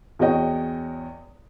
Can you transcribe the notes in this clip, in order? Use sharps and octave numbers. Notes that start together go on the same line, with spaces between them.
E2 F#4 C#5 D#5 G5